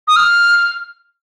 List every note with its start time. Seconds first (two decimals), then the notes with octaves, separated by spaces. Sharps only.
0.07 D#6
0.16 F6